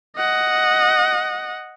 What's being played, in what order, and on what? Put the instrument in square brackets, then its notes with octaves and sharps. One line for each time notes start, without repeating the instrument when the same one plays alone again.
[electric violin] D#5 F#5